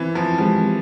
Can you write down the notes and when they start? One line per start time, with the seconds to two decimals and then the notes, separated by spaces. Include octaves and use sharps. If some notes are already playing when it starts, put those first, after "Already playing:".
Already playing: E3 C4
0.15 F3
0.38 E3 F3 G#3 C4 G4